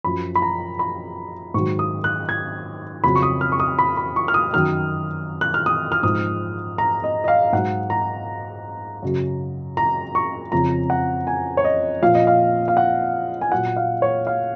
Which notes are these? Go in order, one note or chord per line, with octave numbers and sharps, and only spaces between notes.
F#2 F3 B5
B5
A#5
B5
G#2 D#3 F#3 C#6
D#6
F#6
G#6
F2 C#3 F#3 B5
C#6
D#6
F6
C#6
D#6
B5
B5
C#6
F6
D#6
F#2 D#3 F#3 F6
F#6
F6
D#6
F6
G#2 F3 D#6
A#5
D#5
D#5
F5
G#2 F#3 F#5
A#5
F#2 C#3 F#3
A#5
C#6
F2 C#3 F3 A#5
F#5
G#5
C#5
D#5
A#2 F3 F5
D#5
F5
F5
F#5
G#5
A#2 F#3 F#5
F5
C#5
F5